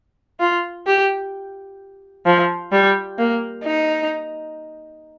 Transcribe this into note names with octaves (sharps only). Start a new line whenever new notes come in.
F4
G4
F3
G3
A#3
D#4